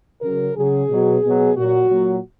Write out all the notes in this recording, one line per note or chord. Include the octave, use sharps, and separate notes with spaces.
C#3 F#3 A#4
C#3 F#3 G#4
B2 F#3
B2 F#3
A#2 F#3 F#4
A#2 F#3